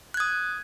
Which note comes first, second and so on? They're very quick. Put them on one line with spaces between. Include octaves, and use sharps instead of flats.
F#6 G#6 D#6